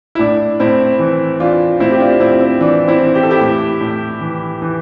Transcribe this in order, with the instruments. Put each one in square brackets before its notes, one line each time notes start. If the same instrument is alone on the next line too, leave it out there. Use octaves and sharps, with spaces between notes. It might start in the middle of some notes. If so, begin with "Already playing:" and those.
[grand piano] E4
A2 D4
A2 C4 E4
E3
E3 D4 F4
A2 C4 E4
G4
D4 F4
A2 C4 E4
C4
E3 D4
C4 E4
E3
G4
A4
E4 G4
A2
A2
E3
E3